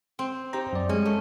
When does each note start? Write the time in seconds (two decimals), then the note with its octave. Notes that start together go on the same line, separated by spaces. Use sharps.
0.19 C4
0.53 D#4 G4 C5 A#5
0.73 F#2 D5
0.89 G3 G#3 C#4
1.05 A3